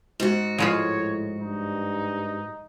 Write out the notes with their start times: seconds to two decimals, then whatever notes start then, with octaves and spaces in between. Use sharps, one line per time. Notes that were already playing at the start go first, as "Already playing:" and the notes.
0.20 G#2 F#4
0.58 A2 F3 G#3 F4 C#5
1.40 G2 D#4